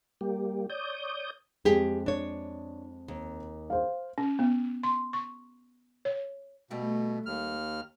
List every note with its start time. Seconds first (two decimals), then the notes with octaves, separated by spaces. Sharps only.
0.21 G3 A#3 G4
0.70 C#5 D5 D#6 G6
1.65 F2 G#3 G4 G#4
2.06 D4 C#5
3.08 D#2
3.70 C5 F5
4.18 C#4
4.39 B3
4.83 C6
5.13 C#6
6.05 C#5
6.71 B2 G3 A3 G4
7.26 D#2 F6